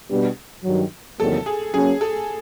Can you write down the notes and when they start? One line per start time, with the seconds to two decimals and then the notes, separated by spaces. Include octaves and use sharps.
0.10 B2 G3 B3 D4 G4
0.64 G2 D#3 F#3
1.19 E2 C3 D#3 F#3 A#3 A4
1.46 G#4
1.74 F#3 A#3 C#4 G#4
2.01 A4